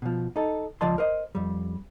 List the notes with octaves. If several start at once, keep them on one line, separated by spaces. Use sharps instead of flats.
B2 F3
D#4 A4
C#2 F3 D5 D#5 A5 C6
A#4 C5 D#5
F2 G3